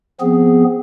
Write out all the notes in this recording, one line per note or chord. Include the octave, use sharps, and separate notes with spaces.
F3 B3 C4 G#4